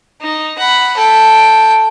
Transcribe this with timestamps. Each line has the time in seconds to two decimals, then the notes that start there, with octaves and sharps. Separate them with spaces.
0.22 D#4
0.58 F#5 B5
0.98 A4 G5